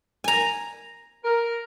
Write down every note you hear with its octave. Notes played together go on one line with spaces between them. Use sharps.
G#5 A#5
A#4